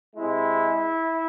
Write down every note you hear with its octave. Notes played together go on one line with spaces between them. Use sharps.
C3 G#3 E4